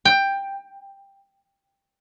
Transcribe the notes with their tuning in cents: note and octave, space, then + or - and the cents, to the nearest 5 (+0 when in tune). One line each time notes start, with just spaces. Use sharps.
G5 +10